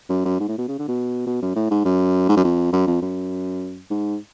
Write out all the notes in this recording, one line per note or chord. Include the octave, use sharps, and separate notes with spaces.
F#2
F#2
G#2
A2
B2
C#3
D3
B2
B2
F#2
A2
G#2
F#2
G#2
F#2
F2
F#2
F2
F#2
G#2